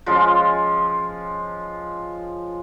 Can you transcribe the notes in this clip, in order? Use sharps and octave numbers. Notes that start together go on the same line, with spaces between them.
F3 G#3 C#4 F4